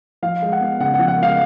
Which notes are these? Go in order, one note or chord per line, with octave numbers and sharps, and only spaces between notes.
F3 F5
G#3
F#5
B3
C#3 F#5
F#5
F3
F#5
G#3 F5